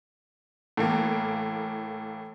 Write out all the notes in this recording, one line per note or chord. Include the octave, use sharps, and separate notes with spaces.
A2 E3 A#3